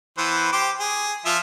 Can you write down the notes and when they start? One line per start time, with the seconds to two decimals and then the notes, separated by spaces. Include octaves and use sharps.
0.18 E3 B3 C5
0.52 G4 C5 D6
0.80 G#4
1.25 F3 F4 E5